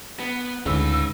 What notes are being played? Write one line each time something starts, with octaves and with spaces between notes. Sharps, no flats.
B3
D2 G#2 C#3 F4 B4 E6